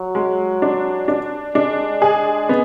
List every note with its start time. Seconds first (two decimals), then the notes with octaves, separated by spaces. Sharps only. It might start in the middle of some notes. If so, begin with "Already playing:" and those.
Already playing: F#3
0.15 G#3
0.62 D4
1.08 D4
1.55 G#3 D4
2.02 G#4
2.49 B3